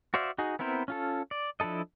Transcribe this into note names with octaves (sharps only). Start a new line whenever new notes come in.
F#4 C5 D5 E5 F5
D#4 F#4 G#4
B3 C4 E4 A#4 C5
C#4 F4 A4
D5
F3 D4 E4 A4 D#5